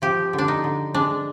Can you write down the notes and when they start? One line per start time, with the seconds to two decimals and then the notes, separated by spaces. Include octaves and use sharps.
0.02 F3 G4
0.33 D3
0.38 D4
0.48 D#4
0.64 D3
0.94 G#3 D4